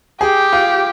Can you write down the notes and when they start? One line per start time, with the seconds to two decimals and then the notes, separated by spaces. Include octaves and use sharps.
0.21 G4 G#4
0.53 F4